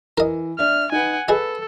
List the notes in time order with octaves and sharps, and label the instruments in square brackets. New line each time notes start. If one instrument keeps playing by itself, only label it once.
[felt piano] E3 [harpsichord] A#4 D#5
[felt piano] D4 E5 [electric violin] F6
[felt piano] D#4 B4 [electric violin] F#5 G#5
[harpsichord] G#4 D#5 [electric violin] A4 [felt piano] B4